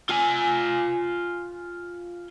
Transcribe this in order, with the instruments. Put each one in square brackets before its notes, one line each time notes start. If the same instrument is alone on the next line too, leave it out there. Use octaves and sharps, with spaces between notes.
[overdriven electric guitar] F4 G#5